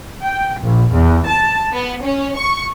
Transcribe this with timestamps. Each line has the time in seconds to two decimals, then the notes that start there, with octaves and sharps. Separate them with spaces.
0.22 G5
0.60 A#1
0.91 E2
1.26 A5
1.73 B3
2.03 C#4
2.37 C#6